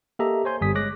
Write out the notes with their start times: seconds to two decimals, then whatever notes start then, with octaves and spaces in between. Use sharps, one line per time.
0.19 A#3 G4 A4 D#5 E5 A#5
0.45 C5 C#5 G#5 C6 G6
0.61 G1 G3 G#5 D#6 B6
0.75 G#3 C#5 D6 F#6 A#6